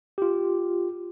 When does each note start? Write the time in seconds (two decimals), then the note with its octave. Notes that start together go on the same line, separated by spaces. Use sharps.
0.18 F4 G4